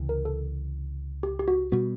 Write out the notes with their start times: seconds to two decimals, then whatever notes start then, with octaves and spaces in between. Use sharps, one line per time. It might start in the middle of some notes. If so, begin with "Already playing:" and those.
Already playing: C#2 C3 E3
0.09 A#4
0.25 A4
1.23 G4
1.39 G4
1.48 F#4
1.72 B2 G3 B3 F#4